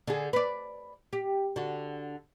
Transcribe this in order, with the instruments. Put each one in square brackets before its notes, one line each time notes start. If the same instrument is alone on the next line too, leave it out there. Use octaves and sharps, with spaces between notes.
[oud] D3 G#4
B4 D5
G4
D3 F#4